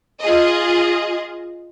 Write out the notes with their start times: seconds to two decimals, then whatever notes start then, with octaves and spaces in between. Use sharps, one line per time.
0.21 F4 G#4 D#5